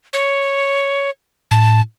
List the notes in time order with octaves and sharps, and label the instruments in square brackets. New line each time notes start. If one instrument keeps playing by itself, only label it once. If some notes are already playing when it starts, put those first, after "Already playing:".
[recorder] C#5
[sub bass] A2 [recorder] A5